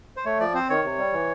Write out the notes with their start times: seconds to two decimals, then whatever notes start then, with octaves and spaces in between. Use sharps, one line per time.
0.17 C5
0.25 A3 C#5
0.40 F3 D5
0.54 C4 C5
0.69 D#3 C#5
0.84 C3
0.98 G3
1.13 E3